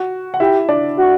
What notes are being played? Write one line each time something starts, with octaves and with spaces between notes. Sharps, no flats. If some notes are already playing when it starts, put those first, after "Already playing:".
Already playing: F#4
F#5
E4 G4 E5
D4 D5
F#4